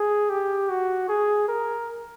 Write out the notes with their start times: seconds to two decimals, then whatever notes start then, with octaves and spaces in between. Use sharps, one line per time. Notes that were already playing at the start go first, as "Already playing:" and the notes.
Already playing: G#4
0.30 G4
0.69 F#4
1.09 G#4
1.48 A#4